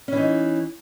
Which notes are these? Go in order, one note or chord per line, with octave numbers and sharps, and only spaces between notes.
E3 C#4 D#4